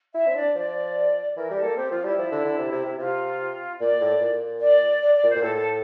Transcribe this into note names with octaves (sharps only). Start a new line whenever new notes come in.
E4 E5
C4
D4 D5
F3 D5
E3 A#4
G3
A4
A#3
C4 G4
F3 F4
G3 E4
F3
D3
D3
C3
C3
C3
C3 F4
A#2 D5
A2
A#2
D5
D5
D5
A#2
C5
A#2
A2 A4
A4